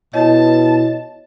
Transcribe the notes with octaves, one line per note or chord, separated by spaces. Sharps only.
B2 E4 C#5 D#5 A5